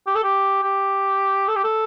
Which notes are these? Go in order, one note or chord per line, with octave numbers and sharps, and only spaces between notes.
G4
A4
G4
G4
A4
G4
A4